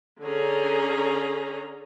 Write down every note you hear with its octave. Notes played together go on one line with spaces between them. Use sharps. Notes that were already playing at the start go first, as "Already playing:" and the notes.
D3 C#4 G#4 A#5